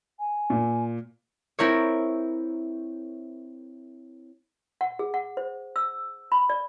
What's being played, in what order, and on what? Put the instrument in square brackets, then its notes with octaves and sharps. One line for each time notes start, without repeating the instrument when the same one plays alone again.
[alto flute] G#5
[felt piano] A#2
[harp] C4 E4 A#4 C#5
[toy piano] F#5
G#4
F#5
C5
E6
B5
D5